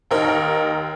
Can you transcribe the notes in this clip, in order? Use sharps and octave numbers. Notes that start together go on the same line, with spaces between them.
D#2 D#4 A#4